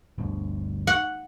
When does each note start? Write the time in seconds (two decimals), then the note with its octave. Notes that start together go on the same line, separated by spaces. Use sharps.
0.18 G1 D2
0.87 F#5